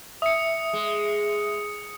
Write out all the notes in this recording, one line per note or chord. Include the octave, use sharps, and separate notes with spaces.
E5 D#6 C#7
G#3